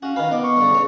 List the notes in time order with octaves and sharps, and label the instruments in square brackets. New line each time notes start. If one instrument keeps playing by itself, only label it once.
[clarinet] C#4 [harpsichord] F#4 F5
[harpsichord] D#3 B4 [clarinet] F5
[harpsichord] B2 D6
[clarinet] C#6
[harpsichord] G2 D3
C#3 C#4